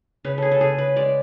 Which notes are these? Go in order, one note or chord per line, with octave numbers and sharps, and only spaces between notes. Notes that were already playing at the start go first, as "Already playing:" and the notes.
C#3 B4
G#4 A4
A4
C#3 G#4
B4
G#3 D5